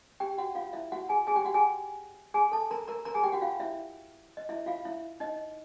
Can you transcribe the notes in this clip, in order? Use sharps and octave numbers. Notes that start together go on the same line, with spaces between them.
G4 G5
F#4 F#5
F4 F5
E4 E5
F#4 F#5
G#4 G#5
G#4 G#5
G4 G5
F#4 F#5
G#4 G#5
G#4 G#5
A4 A5
A#4 A#5
A#4 A#5
A#4 A#5
G#4 G#5
G4 G5
F#4 F#5
F4 F5
E4 E5
D#5
E4 E5
F4 F5
E4 E5
D#4 D#5